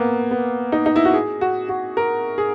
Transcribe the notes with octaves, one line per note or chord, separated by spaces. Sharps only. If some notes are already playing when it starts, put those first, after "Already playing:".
Already playing: A#3 B3
B3
D#4
D#4
E4
F#4
G#4
F#4
F#4
A#4
G#4